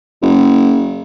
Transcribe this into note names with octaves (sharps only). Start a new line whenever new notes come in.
F#1